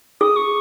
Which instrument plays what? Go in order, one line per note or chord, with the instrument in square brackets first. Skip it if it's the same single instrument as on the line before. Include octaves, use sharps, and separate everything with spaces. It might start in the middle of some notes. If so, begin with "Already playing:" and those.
[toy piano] G#4 [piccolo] D#6
[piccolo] C#6